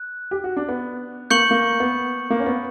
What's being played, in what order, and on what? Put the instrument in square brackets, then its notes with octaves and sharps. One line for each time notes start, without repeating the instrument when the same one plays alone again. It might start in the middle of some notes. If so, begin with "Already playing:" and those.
Already playing: [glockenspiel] F#6
[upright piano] G4
F#4
D4
B3
[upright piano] A#3 [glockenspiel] C#6 G6 C#7 F#7
[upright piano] A#3
B3
A#3
C#4
B3